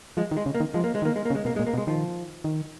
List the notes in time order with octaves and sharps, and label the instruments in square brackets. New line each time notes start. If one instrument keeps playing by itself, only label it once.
[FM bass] F3 [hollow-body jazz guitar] G#3
[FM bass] D#3
[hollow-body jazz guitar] G#3
[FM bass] C#3
[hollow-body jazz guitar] A#3
[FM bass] D#3
[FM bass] F3 [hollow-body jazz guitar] G#3
[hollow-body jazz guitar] A#3
G#3
[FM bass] D#3 [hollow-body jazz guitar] A#3
[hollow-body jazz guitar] G#3
A#3
[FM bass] C#3
[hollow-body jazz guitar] G#3
[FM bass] B2 [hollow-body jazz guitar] A#3
[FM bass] A#2 [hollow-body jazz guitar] G#3
[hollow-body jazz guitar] A#3
[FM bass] B2
[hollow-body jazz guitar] G#3
[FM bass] D#3 [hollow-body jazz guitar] F3
[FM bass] D#3